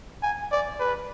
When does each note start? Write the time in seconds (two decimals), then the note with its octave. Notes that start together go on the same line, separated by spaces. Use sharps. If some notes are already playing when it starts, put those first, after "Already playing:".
0.23 G#5
0.52 D5
0.80 B4